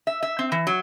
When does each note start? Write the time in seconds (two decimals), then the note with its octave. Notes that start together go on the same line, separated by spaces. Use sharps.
0.07 E5
0.23 E5
0.39 C4
0.52 E3
0.67 F#3